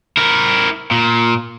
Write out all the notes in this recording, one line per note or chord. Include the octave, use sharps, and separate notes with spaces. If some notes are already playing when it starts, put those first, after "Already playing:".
E4 A#4
A#2